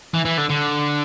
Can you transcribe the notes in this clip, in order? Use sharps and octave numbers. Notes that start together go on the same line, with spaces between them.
E3
E3
D3
D3